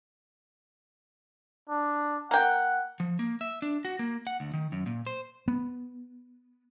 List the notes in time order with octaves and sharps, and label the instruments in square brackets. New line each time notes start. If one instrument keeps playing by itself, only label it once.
[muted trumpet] D4
[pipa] A#3 G5 [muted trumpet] F#5
[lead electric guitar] F3
A#3
E5
D4
F#4
A#3
F#5
D2
D#3
F#2
A#2
C5
[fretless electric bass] B3